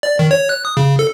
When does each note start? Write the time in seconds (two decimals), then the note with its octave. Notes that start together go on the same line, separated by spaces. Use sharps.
0.03 D5
0.19 D#3
0.31 C#5
0.49 F#6
0.65 D#6
0.77 C#3
0.99 A4